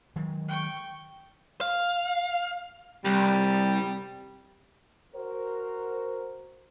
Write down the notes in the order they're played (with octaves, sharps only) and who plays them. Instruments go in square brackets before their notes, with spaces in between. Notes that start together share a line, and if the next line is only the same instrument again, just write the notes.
[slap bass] D#3 F#3 G#3
[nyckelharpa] G5 C#6
[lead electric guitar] F5
[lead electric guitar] C2 [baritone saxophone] G3
[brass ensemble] F#4 A#4 C5